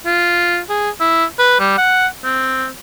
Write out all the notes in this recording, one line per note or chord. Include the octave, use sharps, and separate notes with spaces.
F4
G#4
E4
B4
G3
F#5
C4